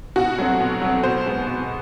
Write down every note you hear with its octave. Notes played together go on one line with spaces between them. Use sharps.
B2 F#4
F#3 A3 C4
B2
F#3 A3 C4
B2 C5
G#3 B3
B2